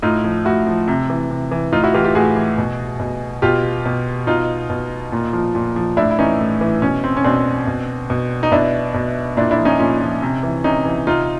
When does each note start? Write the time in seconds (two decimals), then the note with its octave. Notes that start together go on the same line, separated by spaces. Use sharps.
0.02 A2 D#4 F4
0.24 F3
0.45 A2 E4 F#4
0.67 F3
0.88 C3
1.10 E3
1.30 C3
1.51 E3
1.72 A2 D#4 F4
1.84 E4 F#4
1.94 E3 F4 G4
2.04 F4 G4
2.15 A2 F#4 G#4
2.36 E3
2.58 B2
3.00 B2
3.42 B2 F4 G4
3.86 B2
4.27 B2 D#4 F4
4.70 B2
5.12 A#2
5.33 F3
5.55 A#2
5.76 F3
5.97 A2 D4 E4
6.11 E4
6.19 E3 C#4 D#4
6.40 A2
6.61 E3
6.82 B2 C#4
7.04 C4
7.17 C#4
7.24 B2 C4 D4
7.67 B2
8.10 B2
8.43 D#4
8.52 B2 D4 E4
8.94 B2
9.37 A#2 D4 E4
9.51 D4 E4
9.58 F3
9.65 C#4 D#4
9.79 A#2 C#4
10.00 F3
10.22 C3
10.43 E3
10.64 C3 C#4 D#4
10.85 E3
11.07 C3 D#4 F4